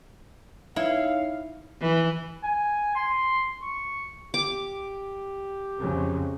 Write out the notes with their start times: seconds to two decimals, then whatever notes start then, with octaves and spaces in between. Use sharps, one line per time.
0.76 D#4 E4 C#5 F5
1.81 E3
2.44 G#5
2.96 C6
3.63 C#6
4.34 G4 D6
5.79 F2 C#3 F#3